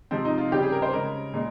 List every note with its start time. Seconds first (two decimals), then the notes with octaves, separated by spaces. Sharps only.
0.11 C3 F3 G#3 C4
0.25 D#4
0.38 F4
0.52 C#3 G3 G4
0.62 G#4
0.72 A#4
0.82 C5
0.93 C#3 G#3 A#4
1.34 A#2 G#3